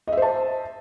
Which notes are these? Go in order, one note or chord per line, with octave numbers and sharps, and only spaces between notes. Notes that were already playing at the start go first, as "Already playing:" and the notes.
C5 D#5 E5 A5